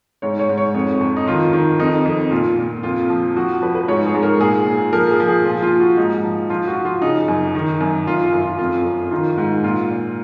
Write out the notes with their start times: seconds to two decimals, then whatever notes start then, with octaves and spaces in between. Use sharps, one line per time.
0.22 G#2 C#5
0.39 C#5
0.49 G#2
0.57 C#5
0.74 F2
1.01 F2
1.17 D#4
1.27 D#3 F4
1.53 D#3
1.79 F2 D#4
2.05 F2
2.31 A#2 F4
2.58 A#2
2.83 F2 F4
3.10 F3
3.36 F3 F#4
3.62 F3 B4
3.75 B4
3.88 G#2 C#5
4.06 G#4
4.14 G#2
4.23 A#4
4.41 A#2 G#4
4.66 A#2
4.93 F3 A#4
5.11 G#4
5.20 F3
5.28 G#4
5.45 A#2 F4
5.63 F4
5.71 A#2
5.80 F#4
5.97 G#2 D#4
6.23 F3
6.50 F3 F4
6.68 F#4
6.76 F3
6.85 F4
7.02 C#3 D#4
7.28 F#2
7.55 D#3
7.81 F#2
8.07 F#2 F4
8.24 F4
8.33 F#2
8.42 F4
8.59 F2 F4
8.85 F2
9.11 D#3 F4
9.38 G#2
9.63 A#2 F4
9.90 A#2